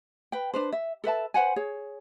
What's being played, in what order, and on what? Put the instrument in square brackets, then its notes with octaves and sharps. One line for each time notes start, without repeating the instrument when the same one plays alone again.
[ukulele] B4 G5
D4 B4 C5
E5
A4 B4 E5 A5
B4 C5 F#5 G#5
G#4 C#5